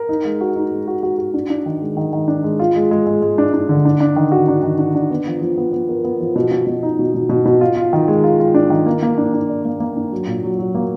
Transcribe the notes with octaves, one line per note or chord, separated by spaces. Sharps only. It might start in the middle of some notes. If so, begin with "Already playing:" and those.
Already playing: A#4
D#4
G#3
F#4
D#4
G#3
F#4
F#4
F#4
D4
D4
D#3
G#3
D#3
D#3
D4
G#3
F4
G#3
G#3
G#3
G#3
D4
D4
D3
D4
D4
D#3
F#4
D4
D#3
D4
D4
B3
F3
F3
B3
B3
A#4
B3
F3
B2
B2
B2
D#4
B2
B2
B2
B2
F4
F4
D#3
G#3
F4
F4
D4
D#3
A#3
A#3
D4
D4
D5
A#3
A#3
D4
F#3
A#2
F#3
F#3
A#3